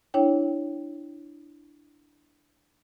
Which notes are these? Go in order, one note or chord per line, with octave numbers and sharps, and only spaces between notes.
D4 E4 C#5 G5